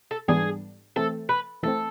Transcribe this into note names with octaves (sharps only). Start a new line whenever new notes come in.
A4
G#2 E3 G3 B3 D4 G#4
E3 A3 C4 A4
B4
E3 A3 C4 A4